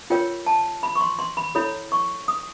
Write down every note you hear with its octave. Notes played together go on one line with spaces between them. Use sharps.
F4 A#4 C#5 G5
A5
B5
C#6
C6
C6
B5
E4 A4 C#5 B5
C#6
D#6